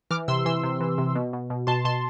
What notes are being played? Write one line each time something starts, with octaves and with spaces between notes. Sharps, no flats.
E3 D6 F6
C3 C6 E6
E3 C6 E6
C3
E3
C3
B2
B2
B2
B2 A5 C6
B2 A5 C6